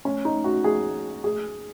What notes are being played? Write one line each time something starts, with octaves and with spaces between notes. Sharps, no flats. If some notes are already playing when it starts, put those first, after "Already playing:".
C#4
D#4
F#4
G#4
G#4